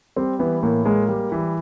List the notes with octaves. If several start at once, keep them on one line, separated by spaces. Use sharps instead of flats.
G3 C4
E3 B3
A2 A#3
G#3 A#3
G3
E3